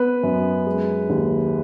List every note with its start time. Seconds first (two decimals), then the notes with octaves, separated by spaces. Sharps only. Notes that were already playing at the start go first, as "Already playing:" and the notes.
Already playing: B3 B4
0.23 F#2
0.66 G#3
1.10 D#2